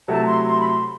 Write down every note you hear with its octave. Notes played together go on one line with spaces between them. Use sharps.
C3 F#3 A3 E4 A5
C6
C6
B5
C6